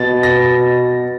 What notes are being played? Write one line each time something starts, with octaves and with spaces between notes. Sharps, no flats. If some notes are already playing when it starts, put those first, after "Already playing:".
Already playing: B2 A6
A#6